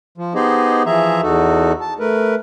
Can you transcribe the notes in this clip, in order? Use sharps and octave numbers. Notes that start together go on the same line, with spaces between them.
F3
B3 D#4 G4 G#4 C5 D#5
E3 F3 G#4 E5 A#5
E2 D#4 F#4 A4
A5
A3 A#4 B4